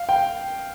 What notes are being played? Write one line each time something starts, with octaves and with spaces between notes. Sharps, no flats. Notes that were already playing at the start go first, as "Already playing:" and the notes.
Already playing: F5
G5